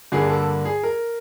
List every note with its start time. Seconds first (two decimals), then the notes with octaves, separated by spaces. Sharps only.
0.12 G2 D3 G3 A#3 G#4
0.30 A4
0.65 G#4
0.83 A#4